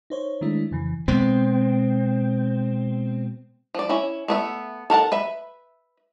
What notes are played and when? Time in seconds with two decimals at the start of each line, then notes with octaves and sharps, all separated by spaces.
0.10 D#4 C5 C#5
0.41 D#3 G#3 A3 D4 E4
0.71 F2 C#3 E3
1.08 B2 G#3 B3 C4
3.75 F3 D5
3.89 C#4 E4
4.28 A3 B3 E5
4.90 A4 A#4 F#5 A5
5.12 B4 E5 B5